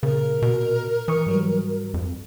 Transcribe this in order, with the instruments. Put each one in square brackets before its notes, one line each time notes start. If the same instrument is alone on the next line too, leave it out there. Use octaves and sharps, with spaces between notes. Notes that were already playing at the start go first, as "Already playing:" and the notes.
[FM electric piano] A#2 [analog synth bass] C#3 [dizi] A#4
[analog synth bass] B2
[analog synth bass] E3 [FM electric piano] C#6 D#6
[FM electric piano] G#2 F#3 G3
[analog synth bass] F2